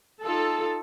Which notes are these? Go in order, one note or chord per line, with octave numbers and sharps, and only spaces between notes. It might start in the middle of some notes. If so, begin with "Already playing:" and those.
D#4 F4 A4